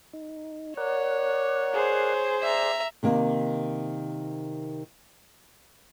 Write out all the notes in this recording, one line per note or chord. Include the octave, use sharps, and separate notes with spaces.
D#4
A#4 C#5 D5 F#5
G#4 C5
D5 E5 A#5
C3 D#3 A#3